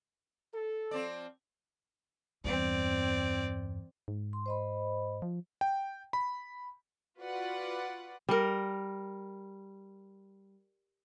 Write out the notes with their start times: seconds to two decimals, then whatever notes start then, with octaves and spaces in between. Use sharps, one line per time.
0.55 A4
0.91 F3 C4 D5
2.44 E2 G2 C4 D5
4.08 G#2
4.33 C6
4.46 C5 D#5 B5
5.22 F3
5.61 G5
6.13 B5
7.20 F4 F#4 B4 D5 F#5
8.29 G3 A#4